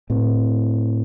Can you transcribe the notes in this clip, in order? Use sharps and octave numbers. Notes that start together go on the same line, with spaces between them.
A2 C4